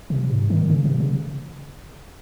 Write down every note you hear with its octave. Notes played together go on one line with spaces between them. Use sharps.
C3
G#2
D#3
C#3
C3
C#3